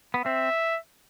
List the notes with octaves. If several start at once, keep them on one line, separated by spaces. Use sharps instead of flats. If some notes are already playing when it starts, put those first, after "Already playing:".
B3
C4 E5